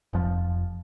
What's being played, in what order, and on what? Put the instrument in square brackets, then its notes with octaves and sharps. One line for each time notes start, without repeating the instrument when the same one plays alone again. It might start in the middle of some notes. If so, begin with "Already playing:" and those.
[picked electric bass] F1 F2 F3